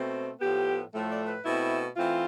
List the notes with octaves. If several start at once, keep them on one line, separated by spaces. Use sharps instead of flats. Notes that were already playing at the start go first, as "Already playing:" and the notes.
Already playing: B2 A3 C4
A2 F3 B3 G4
A2 F3 A3
D5
B4
B2 A3 C4 E4
E3 A3 C4 F4